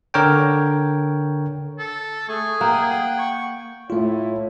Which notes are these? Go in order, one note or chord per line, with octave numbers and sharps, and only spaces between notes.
D3 A#4 C#5 G5
A4
A3 G#4 C#6
A#3 F#5 G5
C#6
A2 A3 E4 F4 C#5